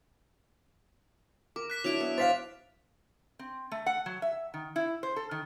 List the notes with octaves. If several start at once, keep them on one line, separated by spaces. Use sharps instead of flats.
A#4 D6
F#6 B6
F#3 D4 E4 D7 F7
B3
C5 F5 A6 B6 F7
C4
A3
F#5
F#3
E5
D#3
E4
C5
A4
D#3